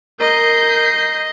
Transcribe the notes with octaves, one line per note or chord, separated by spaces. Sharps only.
A#4 D#5 G6 C7